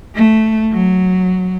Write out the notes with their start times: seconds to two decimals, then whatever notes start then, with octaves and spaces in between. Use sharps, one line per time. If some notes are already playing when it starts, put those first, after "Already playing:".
0.15 A3
0.72 F#3